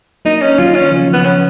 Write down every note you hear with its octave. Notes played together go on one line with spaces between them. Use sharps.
F#3 A#3 D#4
C#4
D#3 F#3 F4
C#4
C#3 F3
B3
C#4